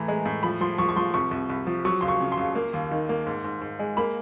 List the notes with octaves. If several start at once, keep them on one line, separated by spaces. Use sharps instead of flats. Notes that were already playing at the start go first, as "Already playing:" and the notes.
Already playing: A2 E3 A3 A#5
G#3
A2
F3 B5
F3 C6
F3 C#6
C#6
F3 C6
C2 C#6
C2
C2
F3
F#3 C#6
C#2 C6
C#6
C#3
C6
C#2
A#3
D#2
D#3
A#3
G#2
G#2
G#2
G#3
A#3 B5